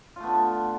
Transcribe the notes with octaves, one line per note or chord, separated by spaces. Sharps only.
D3 A3 B3 F4